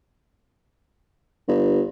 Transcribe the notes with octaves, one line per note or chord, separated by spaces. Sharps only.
G1